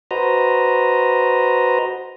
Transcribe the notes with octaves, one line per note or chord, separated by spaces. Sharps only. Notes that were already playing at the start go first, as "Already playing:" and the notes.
F#4 B4 C5 D#5 A#5